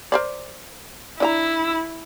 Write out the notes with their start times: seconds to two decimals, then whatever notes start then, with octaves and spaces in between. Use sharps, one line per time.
0.12 A#4 C5 D5
1.20 D4 E4 D#5 A#5